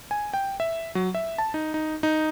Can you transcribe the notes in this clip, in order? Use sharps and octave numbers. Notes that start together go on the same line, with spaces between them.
G#5
G5
E5
F#3
E5
A5
D#4
D#4
D#4